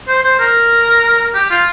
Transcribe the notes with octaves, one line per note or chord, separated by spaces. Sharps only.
C5
C5
A#4
G4
F4